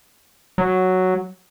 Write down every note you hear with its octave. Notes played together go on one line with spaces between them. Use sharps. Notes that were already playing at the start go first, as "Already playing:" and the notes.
F#3